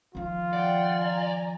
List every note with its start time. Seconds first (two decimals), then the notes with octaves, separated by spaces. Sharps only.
0.15 D#3 F3 F4
0.53 D5 F#5 G5
1.00 G#5 A#5